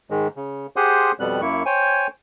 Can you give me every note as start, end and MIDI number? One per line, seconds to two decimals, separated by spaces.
0.10 0.28 44
0.10 0.28 51
0.10 0.28 56
0.36 0.67 49
0.76 1.12 67
0.76 1.12 68
0.76 1.12 72
0.76 1.12 78
0.76 1.12 84
0.76 1.12 87
1.20 1.41 41
1.20 1.41 47
1.20 1.41 55
1.20 1.41 59
1.20 1.41 90
1.42 1.63 42
1.42 1.63 58
1.42 1.63 64
1.42 1.63 85
1.66 2.07 72
1.66 2.07 73
1.66 2.07 79
1.66 2.07 80